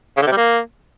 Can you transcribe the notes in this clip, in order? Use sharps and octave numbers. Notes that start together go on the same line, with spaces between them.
C#3
D3
C3
G3
A#3